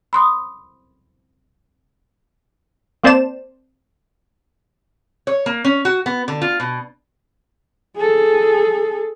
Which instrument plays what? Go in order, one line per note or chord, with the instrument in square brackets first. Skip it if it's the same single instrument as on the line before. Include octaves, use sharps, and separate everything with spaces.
[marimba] B5 C6 D#6
[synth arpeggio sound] A#3 C4 C5 D5 A5 E7
[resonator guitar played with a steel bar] C#5
A#3
C#4
F#4
B3
D3
F4
B2
[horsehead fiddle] G#4 A4